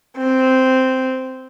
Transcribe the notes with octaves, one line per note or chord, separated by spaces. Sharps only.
C4